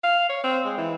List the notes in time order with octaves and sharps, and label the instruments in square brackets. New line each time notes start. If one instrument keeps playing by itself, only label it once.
[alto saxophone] F5
C#5
C4
G#3
E3